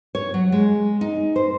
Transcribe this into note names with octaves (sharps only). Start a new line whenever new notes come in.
C#5
F#3
G#3
D#4
C5